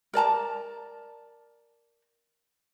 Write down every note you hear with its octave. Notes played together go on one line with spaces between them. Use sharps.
A#4 D5 A5 A#5